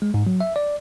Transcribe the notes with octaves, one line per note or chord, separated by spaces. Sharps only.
G#3
G#2
F#3
E5
D5